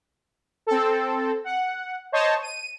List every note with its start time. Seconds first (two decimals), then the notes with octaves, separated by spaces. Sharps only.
0.67 C4 A4
1.44 F#5
2.12 C5 C#5 D#5 A5
2.42 D#7